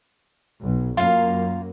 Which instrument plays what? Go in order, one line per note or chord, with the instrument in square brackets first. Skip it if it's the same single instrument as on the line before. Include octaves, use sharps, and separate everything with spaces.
[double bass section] B1
[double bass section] F#2 A#3 [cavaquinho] F4 F5